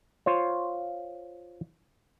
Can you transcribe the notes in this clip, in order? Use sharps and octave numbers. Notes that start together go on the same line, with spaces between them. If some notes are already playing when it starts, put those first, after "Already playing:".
F4 C5 C#5